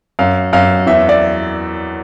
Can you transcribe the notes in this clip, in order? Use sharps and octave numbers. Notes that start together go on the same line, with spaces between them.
F#2 F5
F#2 F5
E2 E5
D5